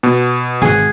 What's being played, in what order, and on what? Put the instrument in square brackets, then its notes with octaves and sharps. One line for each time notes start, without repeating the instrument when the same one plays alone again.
[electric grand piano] B2
[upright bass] G#1 [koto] G#4 F#5